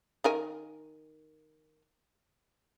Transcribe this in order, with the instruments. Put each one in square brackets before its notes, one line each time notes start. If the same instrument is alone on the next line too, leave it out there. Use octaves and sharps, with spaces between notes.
[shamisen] D#3 A#4 G#5